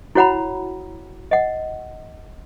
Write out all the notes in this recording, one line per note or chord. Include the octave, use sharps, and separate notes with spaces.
E4 F#4 C#5 F#5 A#5 B5
D#5 F#5